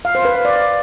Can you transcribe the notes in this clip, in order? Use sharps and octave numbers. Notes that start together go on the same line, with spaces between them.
F5
C5
B4
F5
D5